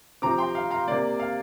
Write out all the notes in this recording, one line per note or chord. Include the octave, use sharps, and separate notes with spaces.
C3 F3 C4 A#5 D6
G5 C6
F5
F5 A#5
C3 A#3 D5
F5